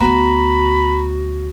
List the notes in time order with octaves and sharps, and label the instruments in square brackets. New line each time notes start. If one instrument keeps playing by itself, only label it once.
[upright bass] D2 B3 [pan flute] F#4 [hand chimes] A#5 [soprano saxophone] B5